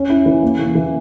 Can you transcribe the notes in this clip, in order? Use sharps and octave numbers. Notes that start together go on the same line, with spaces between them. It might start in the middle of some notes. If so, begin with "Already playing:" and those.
Already playing: C#4
E4
E3
A#3
E3
E3